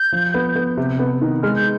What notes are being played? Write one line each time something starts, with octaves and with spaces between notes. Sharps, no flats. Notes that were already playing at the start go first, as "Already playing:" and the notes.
Already playing: G6
F3
B3
B3
C3
B3
D#3
G#3 F6
G6